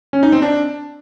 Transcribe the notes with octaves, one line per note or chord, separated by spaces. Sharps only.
C#4
D#4
C4
D4